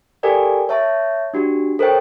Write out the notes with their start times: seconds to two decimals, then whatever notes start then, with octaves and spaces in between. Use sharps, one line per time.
0.23 G4 A4 A#4 D5 G5 G#5
0.69 C#5 E5 A5
1.34 D4 F#4 G4
1.79 A4 A#4 C5 C#5 D#5 G5